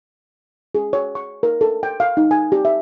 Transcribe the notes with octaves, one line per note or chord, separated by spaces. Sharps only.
G#4
C#5
C#6
A#4
A4
G5
F5
D#4
G#5
G4
E5